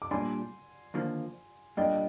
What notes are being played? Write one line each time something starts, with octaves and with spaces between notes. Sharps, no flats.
D6
A#2 G3 D4 G#5 C6
D#2 D3 F3 A#3
A#2 G3 A#3 D4 D#5 G5